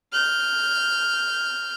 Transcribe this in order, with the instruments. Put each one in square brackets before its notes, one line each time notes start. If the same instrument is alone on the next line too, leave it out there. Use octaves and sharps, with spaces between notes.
[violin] F6 G6